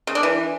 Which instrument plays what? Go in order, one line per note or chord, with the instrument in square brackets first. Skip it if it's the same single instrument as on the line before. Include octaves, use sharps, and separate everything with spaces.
[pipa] C#3
D4
E3